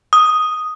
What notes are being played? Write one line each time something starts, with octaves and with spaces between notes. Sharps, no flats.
D#6